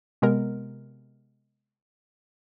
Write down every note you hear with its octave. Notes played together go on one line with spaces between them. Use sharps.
C3 G#3 B3 A#4